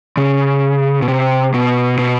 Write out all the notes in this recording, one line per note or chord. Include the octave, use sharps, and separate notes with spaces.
C#3
B2
C3
B2
B2